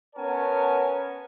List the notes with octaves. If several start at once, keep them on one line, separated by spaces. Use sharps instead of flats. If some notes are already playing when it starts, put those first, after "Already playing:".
B3 C#4 A#4 C#5 G#5 A5